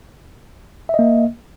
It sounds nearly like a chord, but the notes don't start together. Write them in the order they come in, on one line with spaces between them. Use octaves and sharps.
E5 D#5 A#3